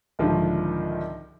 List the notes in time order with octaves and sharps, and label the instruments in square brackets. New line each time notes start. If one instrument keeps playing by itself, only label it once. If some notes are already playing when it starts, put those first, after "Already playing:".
[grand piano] C2 G#2 D3 D#3 F3